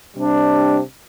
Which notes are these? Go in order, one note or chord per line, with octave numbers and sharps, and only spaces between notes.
C3 G3 D4